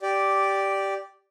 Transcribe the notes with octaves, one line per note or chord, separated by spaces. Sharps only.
G4 D5